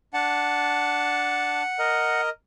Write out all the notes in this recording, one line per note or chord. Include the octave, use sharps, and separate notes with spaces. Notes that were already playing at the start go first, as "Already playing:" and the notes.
D4 F#5 A5
A#4 D#5